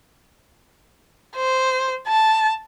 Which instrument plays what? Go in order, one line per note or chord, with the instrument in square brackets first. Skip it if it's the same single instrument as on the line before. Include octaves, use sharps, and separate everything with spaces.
[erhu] C5
A5